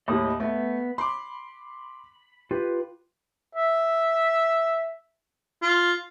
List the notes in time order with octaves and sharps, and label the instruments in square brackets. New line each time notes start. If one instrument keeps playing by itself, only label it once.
[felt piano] D#2 A2 G3 [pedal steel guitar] D#5 B5 D#6
[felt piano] A3 [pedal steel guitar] B3
[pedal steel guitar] B5 [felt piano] C6 D6
[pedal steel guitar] F4 B4 [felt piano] G4
[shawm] E5
F4